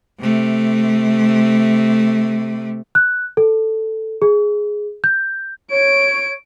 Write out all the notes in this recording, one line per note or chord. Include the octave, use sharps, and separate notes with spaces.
C3 A3
F#6
A4
G#4
G6
C#5 D7